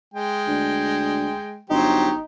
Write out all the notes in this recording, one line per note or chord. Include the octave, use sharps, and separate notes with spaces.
G#3 G5
D2
G1 F#3 D#4 G4 C5